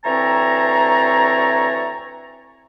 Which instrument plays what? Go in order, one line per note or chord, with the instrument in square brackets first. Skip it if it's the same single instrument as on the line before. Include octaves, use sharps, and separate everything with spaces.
[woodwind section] D2 E3 C4 C#5 A5 A#5